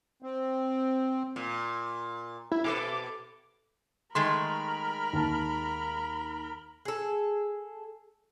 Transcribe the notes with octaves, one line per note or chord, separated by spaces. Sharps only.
C4
A#2
E4
B2 A4 B4 D6
D#3 G#3 A3 A#4 B5 C6
D#2 A5
G#4 A4